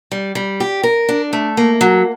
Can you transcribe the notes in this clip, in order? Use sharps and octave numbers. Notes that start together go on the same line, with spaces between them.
G3
G3
G4
A#4
D4
A3
A#3
F#3